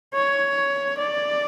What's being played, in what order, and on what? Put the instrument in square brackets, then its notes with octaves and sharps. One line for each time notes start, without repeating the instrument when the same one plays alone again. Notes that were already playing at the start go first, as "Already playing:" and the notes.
[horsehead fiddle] C#5
D5